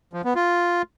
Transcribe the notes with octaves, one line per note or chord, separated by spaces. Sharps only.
F3
B3
F4